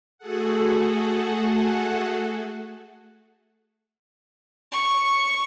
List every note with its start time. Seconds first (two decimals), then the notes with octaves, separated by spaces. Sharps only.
0.18 A3 F#4 G#4 A4 F#5
4.72 C#6